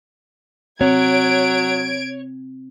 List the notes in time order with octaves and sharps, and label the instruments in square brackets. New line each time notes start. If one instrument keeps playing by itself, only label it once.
[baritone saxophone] F#3 [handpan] C4 [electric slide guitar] C#5 [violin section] G#6 D7